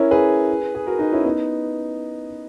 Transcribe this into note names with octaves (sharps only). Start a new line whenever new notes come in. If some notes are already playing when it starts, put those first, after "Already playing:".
Already playing: C#4 E4 A#4 C#5
G#4 B4
G#4
F#4 A#4
D#4 F#4
C#4 E4
B3 D#4